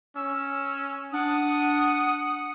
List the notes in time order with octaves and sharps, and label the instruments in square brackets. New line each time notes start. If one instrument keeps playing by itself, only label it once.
[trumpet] C#4 [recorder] E6
[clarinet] D4 [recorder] F#5 [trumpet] D#6